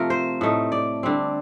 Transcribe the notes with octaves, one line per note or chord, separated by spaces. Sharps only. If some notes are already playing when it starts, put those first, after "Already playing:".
Already playing: C3 F3 A3 C4 A#4
C5
A2 A3 D#4
D5
D3 G3 C4